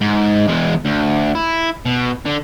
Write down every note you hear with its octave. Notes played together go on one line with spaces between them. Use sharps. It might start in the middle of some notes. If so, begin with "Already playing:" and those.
G#2
E2 G#3
D2
E4
B2
D3